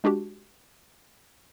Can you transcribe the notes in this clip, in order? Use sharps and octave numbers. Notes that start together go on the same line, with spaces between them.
G#3 D4 F#4 G4